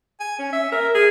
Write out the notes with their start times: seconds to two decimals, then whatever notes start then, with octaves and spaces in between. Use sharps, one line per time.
0.20 G#5
0.39 C#4
0.53 E5
0.72 A#4
0.95 G#4